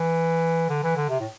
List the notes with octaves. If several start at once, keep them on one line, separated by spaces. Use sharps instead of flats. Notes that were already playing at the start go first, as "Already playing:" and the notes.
Already playing: E3
D3
E3
D3
C3
A2